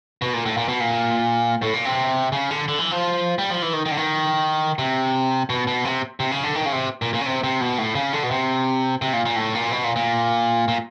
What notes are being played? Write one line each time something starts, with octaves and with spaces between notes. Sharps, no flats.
B2
A#2
A2
A#2
B2
A#2
A2
A#2
C3
C#3
D3
D3
E3
F3
G3
F3
E3
D#3
D#3
D3
D#3
C3
B2
B2
C3
C3
C#3
D3
D#3
C#3
C3
A#2
A#2
C#3
C3
C3
B2
A2
C#3
D3
B2
C3
C3
A#2
A#2
A2
A#2
B2
A#2
A#2
A#2